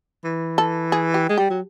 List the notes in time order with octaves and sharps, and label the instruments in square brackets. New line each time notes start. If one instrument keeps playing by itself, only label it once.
[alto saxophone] E3
[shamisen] A4
G#4
G4
[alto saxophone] G#3
[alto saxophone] G3 [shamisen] G4
[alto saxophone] F#3